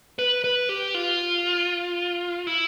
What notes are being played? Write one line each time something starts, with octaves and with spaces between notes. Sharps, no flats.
B4
B4
G4
F4
E4